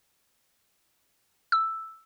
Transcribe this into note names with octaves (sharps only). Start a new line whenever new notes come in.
E6